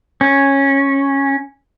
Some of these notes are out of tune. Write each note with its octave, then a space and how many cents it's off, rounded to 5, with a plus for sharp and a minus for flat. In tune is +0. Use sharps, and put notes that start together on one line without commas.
C#4 -10